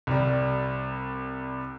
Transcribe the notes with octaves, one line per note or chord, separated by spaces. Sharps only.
C2 G3